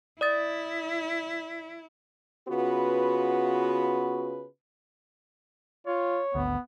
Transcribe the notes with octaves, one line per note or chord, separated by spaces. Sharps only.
E4 D5 D#6 A6
C#3 B3 F4 F#4 B4
F4 C#5
G#1 D2 B3